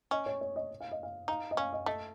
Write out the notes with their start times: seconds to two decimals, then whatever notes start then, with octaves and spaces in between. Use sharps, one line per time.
0.11 C#4 D#5
0.26 C#5
0.41 C#5
0.56 D#5
0.80 F5
0.91 D#5
1.03 F5
1.28 D#4 F5
1.51 D#5
1.57 C#4 F5
1.73 D#5
1.86 A3 D#5